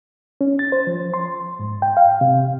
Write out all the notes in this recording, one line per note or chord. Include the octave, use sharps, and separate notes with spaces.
C#4
A6
C5
F3
C6
G#2
G5
F5
C3